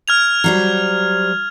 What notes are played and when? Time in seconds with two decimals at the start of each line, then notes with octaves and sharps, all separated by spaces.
0.08 F6 G#6 F7
0.44 F#3 G3 C5